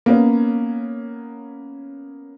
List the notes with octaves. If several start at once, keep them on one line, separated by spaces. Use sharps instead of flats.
A#3 B3 C#4